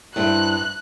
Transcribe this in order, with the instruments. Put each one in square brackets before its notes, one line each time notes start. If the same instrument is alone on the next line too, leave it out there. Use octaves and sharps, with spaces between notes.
[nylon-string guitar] G2 E4 C5 [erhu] F#6